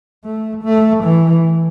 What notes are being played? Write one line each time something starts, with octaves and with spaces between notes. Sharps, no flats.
A3
A3
E3